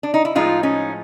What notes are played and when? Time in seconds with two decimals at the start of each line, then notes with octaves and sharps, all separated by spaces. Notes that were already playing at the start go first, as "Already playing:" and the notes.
0.03 D4
0.14 D#4
0.25 E4
0.35 A2 F3 G#3 D#4 F4
0.63 C#4 D#4